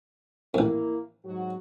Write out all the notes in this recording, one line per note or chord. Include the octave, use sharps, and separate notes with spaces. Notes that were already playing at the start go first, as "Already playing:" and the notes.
A1 F2 A#3 E4
G#2 F#3 F#4